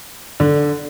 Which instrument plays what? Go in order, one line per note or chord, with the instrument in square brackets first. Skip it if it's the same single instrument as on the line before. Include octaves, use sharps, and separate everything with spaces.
[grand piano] D3